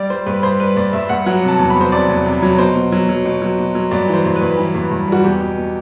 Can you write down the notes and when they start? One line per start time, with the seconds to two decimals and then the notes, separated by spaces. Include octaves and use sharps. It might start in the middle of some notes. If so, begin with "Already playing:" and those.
Already playing: G3 D5
0.10 G3 C5
0.26 G2 B4
0.43 G2 C5
0.60 G3 B4
0.76 G2 D5
0.93 G2 E5
1.09 G2 F#5
1.26 F#3 F#5
1.43 C3
1.48 A5
1.59 E2
1.70 B5
1.76 E2 C5
1.92 C3 D5
2.09 E2
2.26 C3
2.42 F#3
2.59 B2 C5
2.75 B2
2.92 F#3
3.09 F#3
3.25 B2
3.42 F#3
3.58 B2
3.75 F#3
3.91 G2 D5
4.08 E3
4.13 C5
4.25 G2
4.36 B4
4.41 G2
4.58 E3
4.75 G2
4.91 G2
5.08 G3 F#4
5.24 E2 G4
5.41 B2
5.57 B2